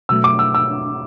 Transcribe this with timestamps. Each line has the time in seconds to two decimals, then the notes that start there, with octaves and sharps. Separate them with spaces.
0.09 B2 F#3 A3 E6
0.24 D6
0.39 E6
0.54 E6